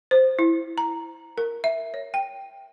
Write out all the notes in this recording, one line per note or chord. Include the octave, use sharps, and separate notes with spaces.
C5
E4
A#5
A#4
E5
C#5
G5